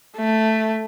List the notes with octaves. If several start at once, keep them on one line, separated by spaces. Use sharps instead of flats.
A3